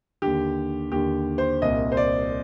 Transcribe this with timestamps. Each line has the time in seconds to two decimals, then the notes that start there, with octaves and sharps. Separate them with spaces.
0.22 D#2 D3 G4
0.92 D#2 D3 G4
1.38 C5
1.62 C2 A#2 D#5
1.92 C5
1.97 D5